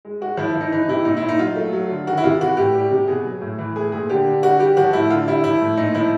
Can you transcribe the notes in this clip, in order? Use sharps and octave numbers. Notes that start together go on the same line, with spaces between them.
G#3
G#3 F#4
F3 E4
E4
F3
D#4
E3 D#4
C3 E4
A#2 D#4
E4
A#2
D#4
F#3 F4
A3
F#3
D3
D#3 F#4
E4
C3 F4
E3 F#4
A2 G4
G3
C3
B2 G#4
F#3
A2
E3
A3 G#4
A#2 G#4
D3 G4
D3
G3 F#4
G3 G4
F3 F#4
A2 E4
D3 F4
G3 E4
F3 E4
A2
A#2 D#4
F3 E4